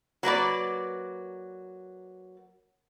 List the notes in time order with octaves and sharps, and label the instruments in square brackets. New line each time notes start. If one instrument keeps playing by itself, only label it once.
[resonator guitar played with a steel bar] F#3 A#3 B4 D5